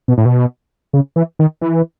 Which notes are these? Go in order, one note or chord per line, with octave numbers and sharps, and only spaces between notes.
B2
A2
B2
C#3
E3
D#3
E3